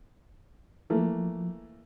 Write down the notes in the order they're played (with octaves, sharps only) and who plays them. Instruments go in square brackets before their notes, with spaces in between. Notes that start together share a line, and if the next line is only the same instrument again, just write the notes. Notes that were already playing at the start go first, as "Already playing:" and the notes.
[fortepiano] E3 A3 A#3 [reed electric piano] F3